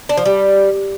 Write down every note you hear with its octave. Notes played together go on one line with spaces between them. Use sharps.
D4
F3
G3